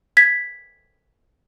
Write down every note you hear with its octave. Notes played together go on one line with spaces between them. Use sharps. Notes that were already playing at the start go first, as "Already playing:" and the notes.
G#6 B6